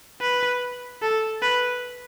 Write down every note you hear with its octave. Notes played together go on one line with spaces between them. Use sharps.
B4
A4
B4